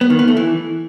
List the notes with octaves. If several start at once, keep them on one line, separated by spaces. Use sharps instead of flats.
B3
D#3
B3
A3
E3